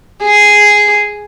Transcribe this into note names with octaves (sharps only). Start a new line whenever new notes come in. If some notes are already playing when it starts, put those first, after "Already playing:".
G#4